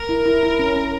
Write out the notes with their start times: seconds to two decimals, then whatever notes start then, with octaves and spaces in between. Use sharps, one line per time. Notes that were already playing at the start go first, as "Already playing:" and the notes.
Already playing: A#4
0.09 E4
0.26 E4
0.43 E4
0.59 C#4
0.76 C#4